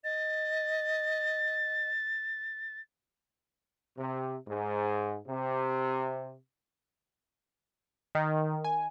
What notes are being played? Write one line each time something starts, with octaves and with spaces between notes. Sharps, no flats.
D#5 A6
C3
G#2
C3
D#3
G#5